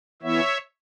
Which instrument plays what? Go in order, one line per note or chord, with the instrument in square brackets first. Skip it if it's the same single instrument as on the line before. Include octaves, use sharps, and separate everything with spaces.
[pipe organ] E3 B3 E4 C#5 E5